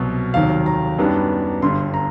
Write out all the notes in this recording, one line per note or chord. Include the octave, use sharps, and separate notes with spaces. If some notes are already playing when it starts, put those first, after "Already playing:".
Already playing: C2 B2 F#3
F1 D#2 D#3 F#3 F5
A#5
F#2 D#3 G3 B3 D4
G1 G2 D3 C6
A#5